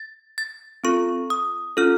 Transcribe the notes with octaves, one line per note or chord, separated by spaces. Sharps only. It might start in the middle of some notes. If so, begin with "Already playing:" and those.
Already playing: A6
A6
C4 F4 A4 C#6
D#6
C#4 F4 A4 F6